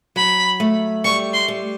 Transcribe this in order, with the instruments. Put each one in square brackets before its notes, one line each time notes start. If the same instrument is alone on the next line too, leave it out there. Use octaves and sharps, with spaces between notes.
[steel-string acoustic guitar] F#3 [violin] B5
[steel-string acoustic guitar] A3
[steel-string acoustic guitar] G3 [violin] C#6
[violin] C6
[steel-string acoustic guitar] G3